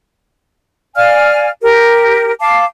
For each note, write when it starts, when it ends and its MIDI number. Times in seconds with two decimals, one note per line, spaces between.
0.96 1.49 74
0.96 1.49 77
0.96 1.49 80
0.96 1.49 89
1.61 2.32 67
1.61 2.32 70
2.41 2.65 77
2.41 2.65 81
2.41 2.65 86